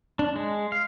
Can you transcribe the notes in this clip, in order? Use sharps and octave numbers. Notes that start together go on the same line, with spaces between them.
D4
G#3
F5